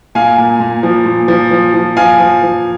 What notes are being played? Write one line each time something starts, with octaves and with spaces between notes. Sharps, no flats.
A#2 F5 G#5
A#2
A#2
F3
A#2
F3
F3
F3
F3 F5 G#5
F3
F3